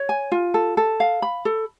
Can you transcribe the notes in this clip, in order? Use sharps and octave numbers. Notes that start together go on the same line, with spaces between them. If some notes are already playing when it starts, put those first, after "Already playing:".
Already playing: C#5
G#5
F4
A4
A4
F5
B5
A4